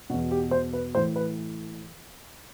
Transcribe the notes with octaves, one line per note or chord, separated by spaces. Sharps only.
E2 B2 F#4
G4
C5
B4
A2 E3 C5
B4